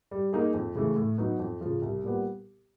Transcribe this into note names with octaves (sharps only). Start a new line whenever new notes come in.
G3
A#3 D#4 G#4
F2
C#3 E3 A3
A2
F#3 B3 D#4
F2
C#3 F3
C2
A#2 G3 B3